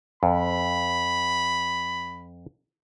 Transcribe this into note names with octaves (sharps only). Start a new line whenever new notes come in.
F2 B5